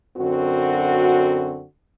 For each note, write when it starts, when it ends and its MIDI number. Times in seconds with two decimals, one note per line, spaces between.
0.17 1.64 42
0.17 1.64 50
0.17 1.64 60
0.17 1.64 66